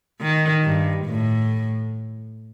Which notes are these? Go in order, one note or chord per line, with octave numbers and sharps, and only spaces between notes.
D#3
G2
A2